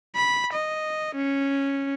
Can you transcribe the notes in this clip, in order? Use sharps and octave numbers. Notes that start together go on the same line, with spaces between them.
B5
D#5
C#4